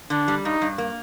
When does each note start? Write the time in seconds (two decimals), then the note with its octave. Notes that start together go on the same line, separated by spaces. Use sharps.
0.10 D3 D4
0.28 G3
0.44 G2 D#4
0.62 G2
0.78 A#3